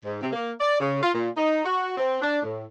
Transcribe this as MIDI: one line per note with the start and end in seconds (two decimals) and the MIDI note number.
0.04 0.17 44
0.20 0.28 48
0.32 0.51 58
0.60 0.77 74
0.79 0.98 49
1.02 1.09 65
1.14 1.28 46
1.35 1.64 63
1.64 1.93 66
1.98 2.18 60
2.22 2.41 62
2.43 2.64 45